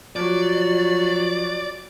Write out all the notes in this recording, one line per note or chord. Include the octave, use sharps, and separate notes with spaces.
F3 F#3 D5